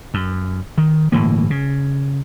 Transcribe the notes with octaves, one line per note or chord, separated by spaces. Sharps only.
F#2
D#3
G1 A2 E3 A#3
C#3